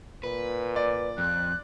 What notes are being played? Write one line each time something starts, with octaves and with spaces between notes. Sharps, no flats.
A#2 B4
D5
F2 F#6